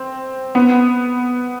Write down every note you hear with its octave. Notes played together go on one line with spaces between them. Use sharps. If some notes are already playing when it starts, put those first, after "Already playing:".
Already playing: C4
B3